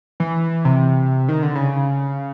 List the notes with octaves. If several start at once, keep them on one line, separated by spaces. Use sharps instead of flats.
E3
C3
D#3
D3
C#3